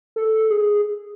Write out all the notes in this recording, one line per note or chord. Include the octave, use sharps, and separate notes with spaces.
A4
G#4